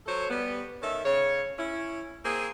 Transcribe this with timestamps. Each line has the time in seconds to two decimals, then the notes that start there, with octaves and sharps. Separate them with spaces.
0.06 F#3 A4 C5 C#5
0.30 G3 B3
0.82 D#3 C#4 A4 E5
1.04 C#3 C#5
1.58 C#4 E4
2.25 A#3 C4 G#4